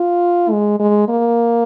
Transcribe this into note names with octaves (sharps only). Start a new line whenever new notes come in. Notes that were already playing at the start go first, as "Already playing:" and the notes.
Already playing: F4
G#3
G#3
A#3